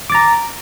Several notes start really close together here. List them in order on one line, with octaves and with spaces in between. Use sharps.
D6 A6 A#5